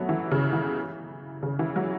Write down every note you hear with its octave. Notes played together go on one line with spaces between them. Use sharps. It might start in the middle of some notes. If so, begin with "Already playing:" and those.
Already playing: F#3 A3 B3
E3
C#3
E3
C#3
E3
F#3